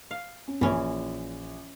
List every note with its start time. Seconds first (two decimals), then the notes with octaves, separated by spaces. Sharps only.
0.11 F5
0.48 C#4
0.61 A#1 E3 C#4